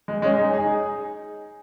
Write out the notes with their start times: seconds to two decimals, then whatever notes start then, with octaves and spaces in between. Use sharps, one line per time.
0.08 G#3
0.22 G#3 C#4
0.38 D#4 G#4
0.53 D#4 G#4